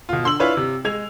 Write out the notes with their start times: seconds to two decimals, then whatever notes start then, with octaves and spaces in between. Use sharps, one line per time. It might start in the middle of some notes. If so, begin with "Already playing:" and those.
0.09 B2 F4
0.24 D3 C6 E6 F#7
0.39 D4 E4 F4 B4 C#5 F5
0.57 C3
0.85 G#3 G#6 F7